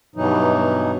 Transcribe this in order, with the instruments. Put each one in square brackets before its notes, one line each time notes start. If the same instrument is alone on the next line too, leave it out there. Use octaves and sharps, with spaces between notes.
[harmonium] G2 B2 E3 F#3 D#4